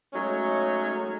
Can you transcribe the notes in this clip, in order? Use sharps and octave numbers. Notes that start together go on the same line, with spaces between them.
F#3 G#3 A3 C#4 D#4 C#5